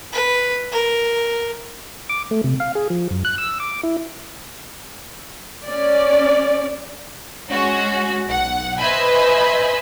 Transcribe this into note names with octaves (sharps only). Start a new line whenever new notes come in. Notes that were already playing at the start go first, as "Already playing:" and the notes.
B4
A#4
D6
A3
C3
F5
G#4
F3
F#2
F#6
E6
D6
E4
C#4 D5
G#3 C#4 F#4
B1 F#5
B4 C5 D#5 E5 G#5 B5